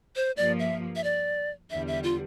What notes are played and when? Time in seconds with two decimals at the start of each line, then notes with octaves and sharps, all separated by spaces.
0.16 C5
0.37 G2 F3 A#3 D5
0.59 E5
0.96 E5
1.04 D5
1.70 E2 D3 G3 E5
1.88 E5
2.03 F4